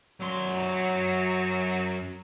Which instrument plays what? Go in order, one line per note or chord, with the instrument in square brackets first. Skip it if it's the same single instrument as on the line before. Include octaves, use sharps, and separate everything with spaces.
[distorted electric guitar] F#2 C6 [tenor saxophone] F#3